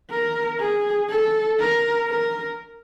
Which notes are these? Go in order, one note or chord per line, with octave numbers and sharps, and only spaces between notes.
A#4
G#4
A4
A#4
A#4